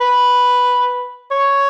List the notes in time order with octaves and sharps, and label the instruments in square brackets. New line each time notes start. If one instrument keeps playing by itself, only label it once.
[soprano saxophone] B4
C#5